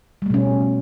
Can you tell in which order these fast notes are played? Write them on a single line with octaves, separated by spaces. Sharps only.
G3 A3 B2 C#4